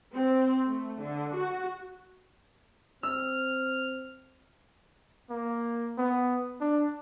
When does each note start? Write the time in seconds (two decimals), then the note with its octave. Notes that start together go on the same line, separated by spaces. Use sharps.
0.14 C4
0.67 A3
1.02 D3
1.37 F#4
3.03 C4 E6 F6
5.30 A#3
5.98 B3
6.61 D4